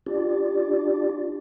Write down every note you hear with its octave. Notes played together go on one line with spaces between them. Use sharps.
D4 F4 G4 D5